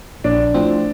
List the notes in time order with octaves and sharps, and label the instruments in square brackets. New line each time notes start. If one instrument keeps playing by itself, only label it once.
[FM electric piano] A#1 [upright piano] D4
[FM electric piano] A2 F3 C4